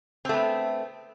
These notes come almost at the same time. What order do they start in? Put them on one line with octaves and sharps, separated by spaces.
C4 A3 B3